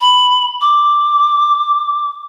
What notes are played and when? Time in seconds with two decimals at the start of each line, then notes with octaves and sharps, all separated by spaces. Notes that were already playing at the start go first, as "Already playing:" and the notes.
0.01 B5
0.61 D6